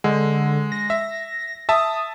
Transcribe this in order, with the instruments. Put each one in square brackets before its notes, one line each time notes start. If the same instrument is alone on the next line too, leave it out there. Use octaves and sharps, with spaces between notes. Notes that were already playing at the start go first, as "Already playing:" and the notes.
[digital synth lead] D3 [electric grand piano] G#3
[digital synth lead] A#6
[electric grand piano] E5
[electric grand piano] E5 A5 [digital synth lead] D#6